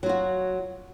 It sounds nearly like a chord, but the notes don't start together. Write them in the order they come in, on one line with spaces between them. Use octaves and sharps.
F#3 F4 F#4